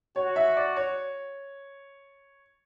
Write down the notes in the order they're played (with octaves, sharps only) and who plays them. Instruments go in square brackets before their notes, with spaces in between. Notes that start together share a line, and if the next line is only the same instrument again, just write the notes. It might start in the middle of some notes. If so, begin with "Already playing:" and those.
[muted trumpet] F#4 [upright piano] C#5
[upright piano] E5
D5
C#5